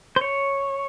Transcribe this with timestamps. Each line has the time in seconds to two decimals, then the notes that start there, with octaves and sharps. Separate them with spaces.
0.16 C5
0.21 C#5